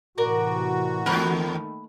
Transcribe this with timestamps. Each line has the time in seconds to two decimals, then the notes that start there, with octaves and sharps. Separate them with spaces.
0.18 A2 C3 E3 F#4 A#4 D5 D6
1.06 E2 D#3 A3 A#3 A#4 B5 F6 F#6